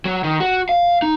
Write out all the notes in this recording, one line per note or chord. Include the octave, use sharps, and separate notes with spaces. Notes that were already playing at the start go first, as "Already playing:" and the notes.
F#3
D#3
F#4
F5
D#4